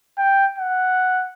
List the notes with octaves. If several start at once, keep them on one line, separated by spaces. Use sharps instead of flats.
G5
F#5